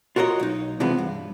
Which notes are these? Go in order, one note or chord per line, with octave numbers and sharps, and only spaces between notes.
F4 F#4 A#4 C#5 D#5
B1 D#4
C3 E3 F3 G#3 B3
G2